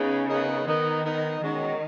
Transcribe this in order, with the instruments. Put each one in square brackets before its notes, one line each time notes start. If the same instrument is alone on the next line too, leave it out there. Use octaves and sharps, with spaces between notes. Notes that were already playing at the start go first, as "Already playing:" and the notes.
Already playing: [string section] C#3 [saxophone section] B3 D#4
[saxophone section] B3 D#4 A#4 D#5
[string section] D#3 [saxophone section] B3 D#4 A#4 D#5
[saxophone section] B3 D#4 A#4 D#5
[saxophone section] B2 G#3 C#4 F#4 C#5 [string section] D#3